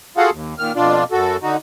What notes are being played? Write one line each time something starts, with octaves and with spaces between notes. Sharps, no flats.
F4 F#4 G#4 A4 F5 F#5
D#2
A#2 D#3 F6
F2 B2 D4 F4 D5
F#2 F#4 A4
D3 D#4 F#4